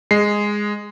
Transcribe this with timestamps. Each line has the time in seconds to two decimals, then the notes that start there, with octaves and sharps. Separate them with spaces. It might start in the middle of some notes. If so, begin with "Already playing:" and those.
0.11 G#3 C7